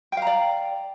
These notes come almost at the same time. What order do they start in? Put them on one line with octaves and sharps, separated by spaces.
G5 F5 A#5 D5